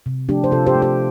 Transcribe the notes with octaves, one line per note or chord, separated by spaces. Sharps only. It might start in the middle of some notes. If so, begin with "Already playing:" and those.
C3
F3 A3 D4 G4
C5
C3 F4 A4
G4 C5
A3
G4 C5